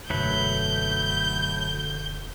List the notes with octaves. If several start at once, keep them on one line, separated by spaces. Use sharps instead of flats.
E1 F#2 D3 F#3 A3 B4 G6